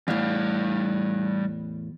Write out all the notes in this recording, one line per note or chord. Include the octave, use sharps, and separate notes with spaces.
E2 A2 G3 F5